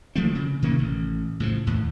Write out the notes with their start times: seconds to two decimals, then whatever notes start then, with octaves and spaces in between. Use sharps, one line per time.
0.16 F3 A3 A#3 C4
0.35 C#3
0.62 C3 D#3 A#3 C#4
0.79 A1
1.40 A2 C#3 F3
1.67 D#2 A2